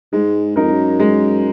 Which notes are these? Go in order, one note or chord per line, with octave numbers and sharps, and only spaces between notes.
G#2 G#3
F#2 D#4 A#4
F2
F#2
G#3